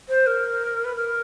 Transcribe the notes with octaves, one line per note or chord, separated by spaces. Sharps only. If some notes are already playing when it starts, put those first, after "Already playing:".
C5
A#4
B4
A#4